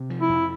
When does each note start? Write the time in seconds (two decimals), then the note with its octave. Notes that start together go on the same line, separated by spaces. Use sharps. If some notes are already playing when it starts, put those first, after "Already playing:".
Already playing: C3
0.10 F3
0.20 E4
0.29 F2